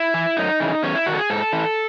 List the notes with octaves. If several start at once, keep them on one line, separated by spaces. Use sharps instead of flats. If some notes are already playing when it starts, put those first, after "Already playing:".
Already playing: E4
E3
F#2 D#4
C#3 E3
E2 C#4
E4
D#3 F#4
A4
G#4
G#2 A4
E3